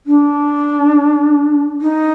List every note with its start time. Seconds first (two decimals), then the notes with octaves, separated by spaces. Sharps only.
0.06 D4
1.81 D#4